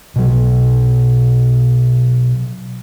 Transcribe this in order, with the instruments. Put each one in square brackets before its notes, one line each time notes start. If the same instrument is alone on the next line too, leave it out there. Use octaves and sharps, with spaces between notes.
[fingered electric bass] B2 F#3